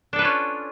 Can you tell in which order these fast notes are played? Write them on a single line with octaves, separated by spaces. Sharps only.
D4 A4 B4 F4 C#4